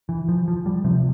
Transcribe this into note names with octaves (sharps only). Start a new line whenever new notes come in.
E3
F3
F3
G3
C3 F3